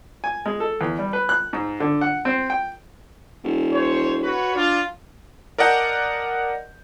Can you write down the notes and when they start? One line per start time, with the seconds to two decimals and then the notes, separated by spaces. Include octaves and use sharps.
0.24 G#5
0.46 G#3
0.60 A4
0.81 E2
0.99 G3
1.13 B4
1.29 F#6
1.53 G#2
1.80 D3
2.01 F#5
2.25 C4
2.50 G5
3.44 E1
3.73 C5 C#5
4.23 F#4 B4 C#5
4.54 D4 F4
5.58 A#4 D5 D#5 F#5 A5 G6